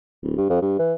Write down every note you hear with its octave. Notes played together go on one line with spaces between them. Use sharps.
D1
G2
F2
G2
E3